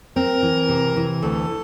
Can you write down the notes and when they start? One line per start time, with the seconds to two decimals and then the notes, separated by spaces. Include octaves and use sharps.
0.16 C4 A#4
0.43 E3
0.69 C3
0.96 E3
1.22 D2 A4